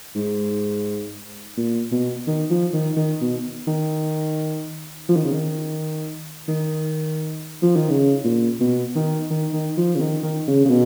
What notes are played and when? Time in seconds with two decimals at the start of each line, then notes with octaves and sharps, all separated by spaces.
0.15 G#2
1.57 A#2
1.91 B2
2.27 D#3
2.50 F3
2.73 D#3
2.97 D#3
3.21 B2
3.67 D#3
5.09 F3
5.16 D#3
5.25 C#3
5.32 D#3
6.48 D#3
7.62 F3
7.76 D#3
7.89 C#3
8.24 A#2
8.60 B2
8.95 D#3
9.30 D#3
9.53 D#3
9.77 F3
9.96 C#3
10.00 D#3
10.23 D#3
10.48 C#3
10.65 C#3
10.70 B2